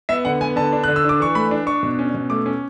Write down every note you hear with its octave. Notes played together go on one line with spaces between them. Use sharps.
B3 E5
D3 F#5
B3 G#5
D3 A5
D4
D3 F#6
E6
D4 D6
E3 C#6
A3 B5
D4
D4 C#6
B2
C#4
B2
A3 D6
C#4